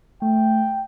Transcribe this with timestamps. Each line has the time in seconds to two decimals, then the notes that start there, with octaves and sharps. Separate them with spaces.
0.22 A3 G5